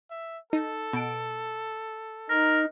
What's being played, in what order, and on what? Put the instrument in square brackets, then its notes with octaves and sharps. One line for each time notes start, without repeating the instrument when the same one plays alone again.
[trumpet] E5
[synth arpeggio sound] D#4 [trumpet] A4
[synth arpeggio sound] B2 D7
[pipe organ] D#4 [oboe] A#4